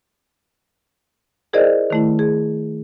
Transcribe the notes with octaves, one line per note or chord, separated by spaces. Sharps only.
E4 G#4 A#4 C5 D5 D#5
D#3 A3 E4
G#4